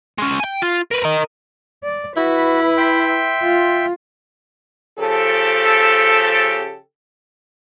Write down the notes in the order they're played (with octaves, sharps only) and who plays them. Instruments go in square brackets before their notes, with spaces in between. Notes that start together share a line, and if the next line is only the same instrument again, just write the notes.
[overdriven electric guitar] G#3 C#4
G5 G#5
F4
A#4 B4
A#4 D#5
[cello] D5
[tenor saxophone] E4 [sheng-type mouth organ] F#4 [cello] B4
[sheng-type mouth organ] E5 G5 C6
[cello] F4
[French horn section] C#3 F3 G4 A4